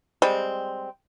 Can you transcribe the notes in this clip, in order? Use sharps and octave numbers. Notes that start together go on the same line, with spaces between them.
G3 G#3 C4